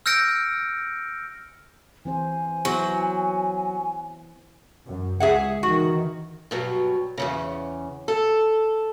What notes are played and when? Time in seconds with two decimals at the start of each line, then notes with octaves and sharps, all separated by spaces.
0.06 E6 F6 G6 A#6 C#7 D7
2.05 E3 C4 C5 G#5
2.65 F#3 B3 E4 C5
4.86 F#2
5.20 C#2 G#4 E5 F#5
5.63 D#3 E3 F#4
6.51 G2 B2 F#3
7.17 E2 G2 C#3
8.08 A4